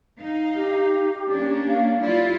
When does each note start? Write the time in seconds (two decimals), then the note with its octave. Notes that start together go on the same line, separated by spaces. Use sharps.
0.20 D#4 F5
0.55 G4
1.30 A#3 C#4 D4
1.69 F5
2.01 G3 E4 F4 D5